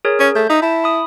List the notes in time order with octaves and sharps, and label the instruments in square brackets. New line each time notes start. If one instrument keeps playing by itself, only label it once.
[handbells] G#4 A#4 C#5
[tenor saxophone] C#4
[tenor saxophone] A3 [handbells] G6
[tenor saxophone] D#4 [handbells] E5
[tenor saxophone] E4 [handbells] A5
[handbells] B5 D#6